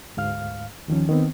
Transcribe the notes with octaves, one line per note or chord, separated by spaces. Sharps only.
D2 G#2 F5 F6
D#2 D#3 F3 C#4
D#3 B3 C4